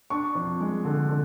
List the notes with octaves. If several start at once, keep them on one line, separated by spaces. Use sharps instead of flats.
D4 C#6
F2
G#3
D3
D3